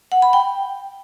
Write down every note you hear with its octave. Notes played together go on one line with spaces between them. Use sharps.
F#5
B5
G5